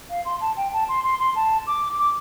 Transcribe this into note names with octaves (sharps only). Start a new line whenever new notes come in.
F5
C6
A5
G5
A5
C6
C6
C6
A5
D6
D6